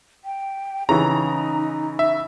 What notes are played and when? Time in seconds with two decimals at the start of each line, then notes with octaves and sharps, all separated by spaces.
0.25 G5
0.89 C#3 E3 D#4 A#5
1.99 E5